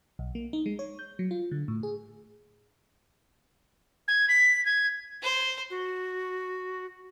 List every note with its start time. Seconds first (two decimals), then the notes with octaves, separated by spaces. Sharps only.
0.19 B1
0.35 A#3
0.53 D#4
0.66 G#3
0.79 C#5
0.99 G6
1.19 F#3
1.31 F4
1.51 D3
1.68 A2
1.83 G#4
4.08 G#6
4.29 B6
4.65 G#6
5.22 C5
5.70 F#4